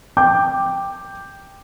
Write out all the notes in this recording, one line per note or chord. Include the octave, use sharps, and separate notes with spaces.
G5 D6 G6